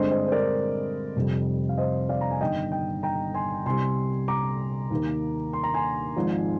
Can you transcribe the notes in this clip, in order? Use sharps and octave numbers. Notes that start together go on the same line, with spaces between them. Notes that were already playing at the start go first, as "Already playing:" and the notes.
Already playing: G2 D3 G#3 C4 C5 D#5
C5 D#5
C5
A#4 D5
F1 F2 C3 G3
F5
C5 D#5
D5 F5
A#5
G#5
G1 G2 D#3 D#5 G5
D#5 G5
G5 A#5
G#5 C6
C2 C3 G3 G#5 C6
A#5 D6
D#2 D#3 A#3
C6
A#5
G#5 C6
G#1 G#2 F3